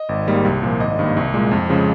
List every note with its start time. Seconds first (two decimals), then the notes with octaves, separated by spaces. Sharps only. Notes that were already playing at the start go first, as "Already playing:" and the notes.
Already playing: D#5
0.09 G#1
0.27 G#2 G3 A#3
0.45 C2
0.62 A#2 F3
0.80 G#1 D#5
0.99 G2 D#3 A#3
1.17 C2
1.34 A#2 G#3
1.51 F2
1.69 C#3 F3 G#3